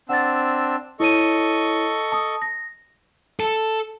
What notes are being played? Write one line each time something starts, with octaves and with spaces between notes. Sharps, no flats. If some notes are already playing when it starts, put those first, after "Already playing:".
C4 D4 F#5 E6 A6
E4 A4 C#5 D#5 C#6 D#7
A5 D#6
A#6
A4